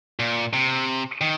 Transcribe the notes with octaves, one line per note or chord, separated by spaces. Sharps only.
A#2
C3
D#3